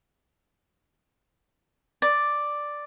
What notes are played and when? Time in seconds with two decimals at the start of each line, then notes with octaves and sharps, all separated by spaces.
2.02 D5